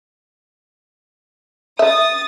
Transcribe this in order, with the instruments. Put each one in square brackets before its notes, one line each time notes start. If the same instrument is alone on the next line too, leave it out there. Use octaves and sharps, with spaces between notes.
[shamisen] E5 [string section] D#6 A6